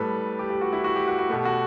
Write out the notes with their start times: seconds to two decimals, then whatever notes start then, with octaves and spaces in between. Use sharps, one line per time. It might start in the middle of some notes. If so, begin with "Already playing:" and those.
Already playing: A2 G3 A4 B4
0.39 G4
0.50 G4
0.61 F#4
0.73 E4
0.84 F#4
0.96 G4
1.08 F#4
1.19 F#4
1.30 B2 A3 G4
1.45 F#4